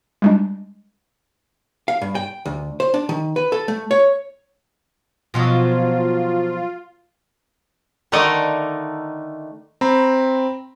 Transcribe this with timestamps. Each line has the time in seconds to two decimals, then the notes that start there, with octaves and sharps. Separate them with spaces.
0.22 G3 G#3 D4
1.88 F5
2.01 G2
2.15 G5
2.45 D2
2.80 C5
2.94 D4
3.09 D#3
3.36 B4
3.52 A4
3.68 A3
3.91 C#5
5.34 B2 F3 F#3 F4
8.12 D3 D#3 A3 D#4 D5 D#5
9.81 C4 A#5 B5